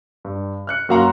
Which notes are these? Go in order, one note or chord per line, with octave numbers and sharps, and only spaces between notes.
G2
F6 F#6 C#7
F#2 A#3 F#4 F5 A#5 C6